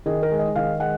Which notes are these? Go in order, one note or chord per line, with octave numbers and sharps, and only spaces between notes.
D#3 G#4
A#4
G#3
D#5
D#3 F5
G#3 F#5